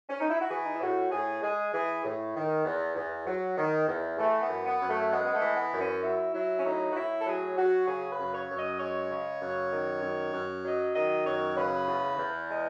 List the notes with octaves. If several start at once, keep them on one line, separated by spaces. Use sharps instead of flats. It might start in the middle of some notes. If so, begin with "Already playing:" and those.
C#4
D#4
E4
F#4
E3 G#4
D#4
E4
A2 F#4
A2 G#4
G#3 G#4
E3 G#4
A2
D#3
E2
E2
F#3
D#3
E2
E3 A3
B3
F#2
B3
F#2
A3
G#3 B3
B3
A3
E3
B3
F#2
C#4
F#3 E4
F#3 E4
C#4
A2 D#4
F#4
A2 E4
A4
F#3 G#4
F#3 F#4
C#3 G#4
B4
F#2
C#5
F#2
D#5
G#3 C#5
C#3
F#2
D#3
F#2
F#2
F#3 D#5
D#3 D#5
F#2 C#5
C#3 B4
E2
E2
G#3